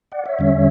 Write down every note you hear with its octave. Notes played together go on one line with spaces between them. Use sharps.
D5 F#5
C#5 E5
E2 D3 G3 C#4